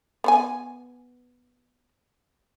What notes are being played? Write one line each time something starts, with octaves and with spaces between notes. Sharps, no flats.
B3 C5 G#5